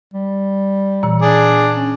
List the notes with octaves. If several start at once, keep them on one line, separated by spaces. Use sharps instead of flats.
G3
A#2 E3
D4 G#4 D5
C#4